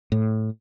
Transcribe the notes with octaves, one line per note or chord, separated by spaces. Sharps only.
A2